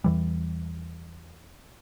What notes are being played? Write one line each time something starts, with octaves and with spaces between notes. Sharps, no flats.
E2 E3 G3